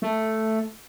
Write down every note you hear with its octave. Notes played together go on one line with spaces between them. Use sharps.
A3